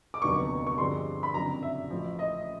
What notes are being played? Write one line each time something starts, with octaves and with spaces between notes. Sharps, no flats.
D6
F1 D#2 D3 F#3 B3 C#6
C#6
G2 D3 F3 G#3 C4 C6
B5
F#1 F2 D3 F#3 A#5
E5
A1 A2 F3
D#5